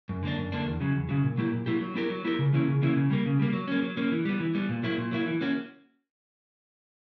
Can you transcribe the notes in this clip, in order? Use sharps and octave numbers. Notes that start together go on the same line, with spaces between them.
F#2
D3 A#3 D4
F#2
D3 A#3 D4
E2
C#3 F#3
E2
C#3 F#3
A#2
F#3 A#3 E4 G4
A#2
F#3 A#3 E4 G4
F#3
B3 E4 G4 A#4
F#3
B3 E4 G4 A#4
C#3
E3 A#3 C#4 E4
C#3
E3 A#3 C#4 E4
C#3
G3 A#3
C#3
G3 A#3
F#3
A#3 C#4
F#3
A#3 C#4
E3
G3 B3
E3
G3 B3
A#2
F#3 A#3 E4
A#2
F#3 A#3 E4
E3
A#3 C#4 F#4